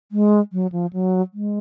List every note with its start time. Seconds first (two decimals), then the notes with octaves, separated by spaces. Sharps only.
0.12 G#3
0.53 F#3
0.72 F3
0.93 F#3
1.34 G#3